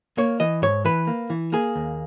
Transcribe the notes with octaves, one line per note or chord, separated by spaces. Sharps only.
A#3 C#5
E3 D#5
G#2 C#5
E3 B4
A#3
E3
A#3 G#4
D#2